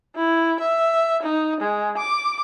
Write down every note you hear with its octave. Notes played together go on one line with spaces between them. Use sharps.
E4
E5
D#4
G#3
D6